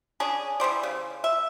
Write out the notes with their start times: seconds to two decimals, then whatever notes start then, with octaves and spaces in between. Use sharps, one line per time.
0.20 C#4 D4 G#4
0.60 E3 G3 C5 D5
0.83 C#3
1.24 E5